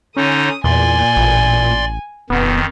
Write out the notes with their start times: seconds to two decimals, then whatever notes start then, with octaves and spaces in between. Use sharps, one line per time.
0.17 D3 C#4 D#4 D#6
0.64 E2 A#2 D5 G#5 C6
1.16 A1
2.30 D#1 F2 D#3 B3